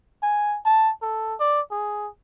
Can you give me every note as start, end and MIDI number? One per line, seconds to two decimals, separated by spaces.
0.23 0.58 80
0.66 0.92 81
1.02 1.35 69
1.40 1.61 74
1.72 2.09 68